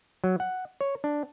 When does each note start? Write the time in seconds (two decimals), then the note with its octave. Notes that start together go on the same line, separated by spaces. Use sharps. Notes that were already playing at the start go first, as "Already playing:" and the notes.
0.24 F#3
0.40 F#5
0.81 C#5
1.04 D4